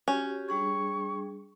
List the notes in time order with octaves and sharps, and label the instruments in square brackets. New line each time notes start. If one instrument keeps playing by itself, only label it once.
[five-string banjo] C#4 [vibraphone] F#4 G4
[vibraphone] G3 D4 G#4 [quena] C#6